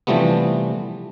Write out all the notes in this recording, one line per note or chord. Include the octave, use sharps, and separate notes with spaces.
C3 E3 F3 G3 A3 B3